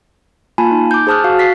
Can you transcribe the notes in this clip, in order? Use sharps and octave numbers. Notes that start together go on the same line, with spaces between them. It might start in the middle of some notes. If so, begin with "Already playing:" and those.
A#3 F4 G#5 A5 B5
D#4
D6 G6
G#4 C5 A5 D#6 F6 F#6
F#4 F5
A6 B6 C7